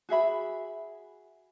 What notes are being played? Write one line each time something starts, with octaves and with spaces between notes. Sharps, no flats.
F#4 G#4 E5 B5